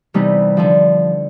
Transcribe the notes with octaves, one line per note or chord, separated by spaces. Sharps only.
C3 E3 G3 B3 D#4
D3 F3